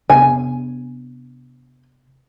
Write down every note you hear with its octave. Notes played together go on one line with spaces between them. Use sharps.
C3 B3 D4 G#5